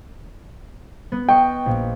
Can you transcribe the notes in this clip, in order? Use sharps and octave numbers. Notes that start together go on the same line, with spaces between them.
B3
D#5 G5 C#6
A#1